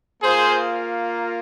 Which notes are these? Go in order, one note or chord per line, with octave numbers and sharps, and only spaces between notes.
A#3 F4 G#4 C5